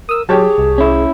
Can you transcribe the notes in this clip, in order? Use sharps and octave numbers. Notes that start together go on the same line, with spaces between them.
A#4 D#6 E6
F#3 G4 G#4 C#5 A5
C2
C#4 E4